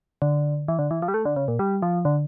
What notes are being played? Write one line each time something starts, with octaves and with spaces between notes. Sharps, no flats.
D3
E3
D3
E3
F3
G3
A3
D3
C#3
A#2
G3
F3
D3